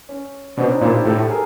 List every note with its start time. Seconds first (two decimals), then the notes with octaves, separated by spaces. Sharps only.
0.09 C#4
0.57 B2 C4 D4
0.69 C#4 D#4
0.81 A#2 D4 E4
0.93 F4 G4
1.05 A2 G4 A4
1.29 G#4 A#4